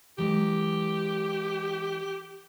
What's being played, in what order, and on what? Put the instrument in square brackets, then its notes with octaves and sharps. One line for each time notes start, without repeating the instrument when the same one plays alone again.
[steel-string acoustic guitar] E3 F#3 G#3 [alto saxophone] G4